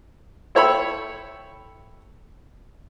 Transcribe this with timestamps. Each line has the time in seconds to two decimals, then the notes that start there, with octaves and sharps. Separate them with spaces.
0.55 E4 A4 C#5 G5 B5 E6